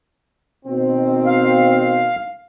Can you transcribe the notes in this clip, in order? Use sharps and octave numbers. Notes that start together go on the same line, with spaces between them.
B2 D#3 C4
F5